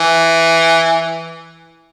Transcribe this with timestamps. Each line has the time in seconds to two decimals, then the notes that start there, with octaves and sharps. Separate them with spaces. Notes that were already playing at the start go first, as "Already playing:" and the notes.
Already playing: E3